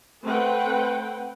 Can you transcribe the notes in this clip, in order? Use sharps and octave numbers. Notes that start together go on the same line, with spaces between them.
A3 C4 B4 F#5 G5